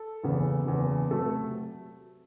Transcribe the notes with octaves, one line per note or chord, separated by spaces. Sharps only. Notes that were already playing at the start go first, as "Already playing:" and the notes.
Already playing: A4
F#1 E2 C#3 E3
F#1 E2 C#3 E3
C3 F#3 A3 A4